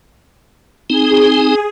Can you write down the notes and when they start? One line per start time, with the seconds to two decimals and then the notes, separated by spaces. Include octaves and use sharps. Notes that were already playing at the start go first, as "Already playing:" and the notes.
0.90 C4 D#4 G#4